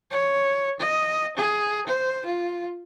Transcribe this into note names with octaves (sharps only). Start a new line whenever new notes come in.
C#5
D#5
G#4
C5
F4